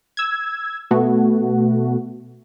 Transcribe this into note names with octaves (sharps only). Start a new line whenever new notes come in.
E6 G#6
B2 A3 B3 F#4